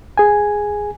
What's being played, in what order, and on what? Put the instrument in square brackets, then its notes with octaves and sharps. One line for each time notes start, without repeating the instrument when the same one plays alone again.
[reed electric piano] G#4 G#5